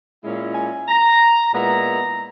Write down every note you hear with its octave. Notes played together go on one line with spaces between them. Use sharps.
A#2 G#3 C#4 E4
G#5
A#5
A#2 G#3 B3 E4 A#5